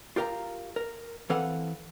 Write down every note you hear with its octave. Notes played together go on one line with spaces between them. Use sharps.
F4 G4 A#4 F5 A#5
A#4
E3 C4 A4 B4 F5 F#5